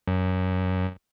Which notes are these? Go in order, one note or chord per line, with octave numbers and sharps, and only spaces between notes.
F#2